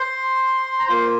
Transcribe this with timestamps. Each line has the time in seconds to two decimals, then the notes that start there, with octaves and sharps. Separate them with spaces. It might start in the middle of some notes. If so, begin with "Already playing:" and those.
Already playing: C5 C6
0.79 A#5
0.89 A#3 F4 C5 C6